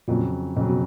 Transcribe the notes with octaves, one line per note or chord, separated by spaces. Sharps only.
F2 A#2 C#3 F#3
F2 A#2 C#3 F#3
B2